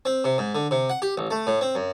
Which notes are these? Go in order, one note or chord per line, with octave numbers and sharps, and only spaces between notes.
C4
C3
G#2
D3
C3
F#5
G4
A1
A3
A2
C4
F#2